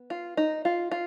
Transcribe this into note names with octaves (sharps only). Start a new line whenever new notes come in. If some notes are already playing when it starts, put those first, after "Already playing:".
Already playing: B3
F4
D#4
F4
F4